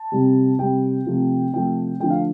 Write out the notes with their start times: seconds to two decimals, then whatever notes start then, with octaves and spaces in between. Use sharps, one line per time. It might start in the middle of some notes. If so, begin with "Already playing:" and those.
Already playing: A5
0.12 C3 G3
0.59 C3 G3 G5
1.06 C3 F3 A3
1.54 C3 F3 A3 G5
2.00 D3 F3 A3 G5
2.10 F5